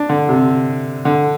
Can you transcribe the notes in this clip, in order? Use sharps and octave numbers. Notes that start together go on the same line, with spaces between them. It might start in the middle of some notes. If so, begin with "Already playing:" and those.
Already playing: D4
D3
C3
D3